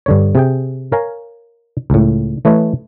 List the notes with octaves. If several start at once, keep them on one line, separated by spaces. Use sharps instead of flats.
G2 D3 C#5
C3 G#4 G5
A#4 C#5 F5 G#5 A#5
C#2 A2
E3 A3 B4 C#5 D#5